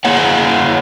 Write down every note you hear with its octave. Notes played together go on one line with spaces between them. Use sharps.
A#3 E4 C#5 F#5